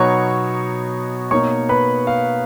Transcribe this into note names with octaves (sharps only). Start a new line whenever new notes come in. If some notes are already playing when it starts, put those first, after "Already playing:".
Already playing: B2 F#3 B3 D#4 C#5 C#6
B2 A#3 D#4 C#5 C#6
B4 B5
F5